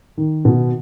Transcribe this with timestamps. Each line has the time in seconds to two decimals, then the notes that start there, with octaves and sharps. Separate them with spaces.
0.17 D#3
0.45 B2